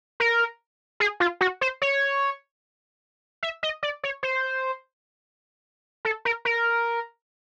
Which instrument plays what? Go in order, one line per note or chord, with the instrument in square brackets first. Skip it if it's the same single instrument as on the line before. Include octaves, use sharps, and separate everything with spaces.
[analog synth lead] A#4
G#4
F4
F#4
C5
C#5
E5
D#5
D5
C#5
C5
A4
A#4
A#4